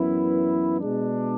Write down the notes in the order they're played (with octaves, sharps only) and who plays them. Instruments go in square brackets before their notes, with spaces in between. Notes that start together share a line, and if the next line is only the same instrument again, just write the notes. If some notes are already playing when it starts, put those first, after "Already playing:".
Already playing: [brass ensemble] F#2 E3 B3 E4
B2 G#3 D4